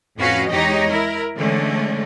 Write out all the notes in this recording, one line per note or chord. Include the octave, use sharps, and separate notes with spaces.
F2 A2 C#4 F#4 B4 F5
E2 G#3 D#4 G4 C#5 D#5
E4 A#4
D3 E3 G#3 A3 C#4